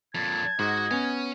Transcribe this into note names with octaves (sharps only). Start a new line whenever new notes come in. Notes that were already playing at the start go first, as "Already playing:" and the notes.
F2 A#2 A5 G#6
G#2 F#4 D#5
B3 C#4 C#5 G#5